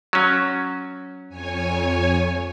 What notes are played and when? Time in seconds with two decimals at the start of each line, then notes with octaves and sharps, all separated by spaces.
0.13 F#3 C#4
1.29 F2 C#5 G#5